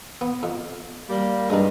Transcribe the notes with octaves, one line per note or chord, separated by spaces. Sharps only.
B3
F2
G3 A#3
G2 G#3 D#4